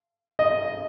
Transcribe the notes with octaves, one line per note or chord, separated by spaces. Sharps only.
D#5